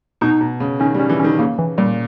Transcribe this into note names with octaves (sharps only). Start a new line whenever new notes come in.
B2 D#4
B2
C#3
D#3 C#4
G3
C#4
E3
C#4
D#3
C#3 A#3
E3
A#2 G3